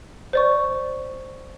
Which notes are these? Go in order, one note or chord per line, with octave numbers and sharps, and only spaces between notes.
C5 D5 C#6